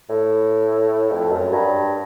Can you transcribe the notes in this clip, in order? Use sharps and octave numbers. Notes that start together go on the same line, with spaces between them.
A2
F2
F#2
G2